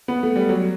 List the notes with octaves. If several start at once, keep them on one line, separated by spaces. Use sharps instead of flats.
B3
A3
G3
F#3